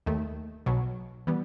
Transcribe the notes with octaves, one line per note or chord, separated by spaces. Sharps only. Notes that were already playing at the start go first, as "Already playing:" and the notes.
D#2 D#3 A3
B1 B2 F#3
E3 G3 B3